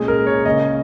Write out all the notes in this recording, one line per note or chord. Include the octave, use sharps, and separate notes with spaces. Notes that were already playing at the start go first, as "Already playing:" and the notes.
Already playing: A#2 G#3 C#4 G#4
A#4
C#5
C#3 A#3 C#4 D#5